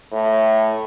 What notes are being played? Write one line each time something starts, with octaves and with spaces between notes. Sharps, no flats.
A2